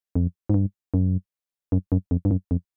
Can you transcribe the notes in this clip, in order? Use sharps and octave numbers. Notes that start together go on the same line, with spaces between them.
F2
G#2
G2
F#2
F#2
F#2
F2
G2
F#2
F2